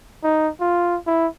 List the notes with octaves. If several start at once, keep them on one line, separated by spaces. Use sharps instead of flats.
D#4
F4
E4